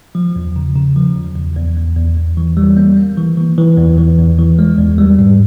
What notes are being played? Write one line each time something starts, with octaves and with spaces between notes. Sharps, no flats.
F3
E2
C#3
C#3
F3
E2
E2
E2
E2
E2
E2
E3
G3
A#3
A#3
E3
E3
E3
E2
E3
E2
E3
G#3
E2
G3
G#2